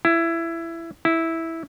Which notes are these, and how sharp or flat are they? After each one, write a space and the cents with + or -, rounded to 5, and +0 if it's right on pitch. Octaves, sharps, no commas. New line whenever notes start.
E4 +15
E4 -10